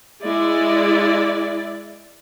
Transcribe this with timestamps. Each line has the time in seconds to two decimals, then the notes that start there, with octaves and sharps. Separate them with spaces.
0.23 G#3 E4 D5